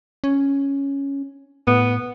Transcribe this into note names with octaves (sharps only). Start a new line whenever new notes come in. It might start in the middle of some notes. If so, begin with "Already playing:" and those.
C#4
A2 B3